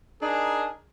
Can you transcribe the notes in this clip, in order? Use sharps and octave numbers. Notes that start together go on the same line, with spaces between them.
D4 D#4 G#4 A#4